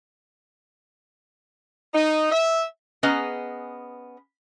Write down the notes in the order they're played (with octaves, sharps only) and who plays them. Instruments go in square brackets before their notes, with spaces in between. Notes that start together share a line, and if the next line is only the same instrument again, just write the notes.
[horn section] D#4
E5
[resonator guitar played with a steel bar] B3 C#4 G#4 B4 D#5 A#5